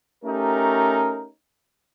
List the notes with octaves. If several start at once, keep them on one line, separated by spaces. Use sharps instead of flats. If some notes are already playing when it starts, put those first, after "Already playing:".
A3 C#4 D#4 G4 A#4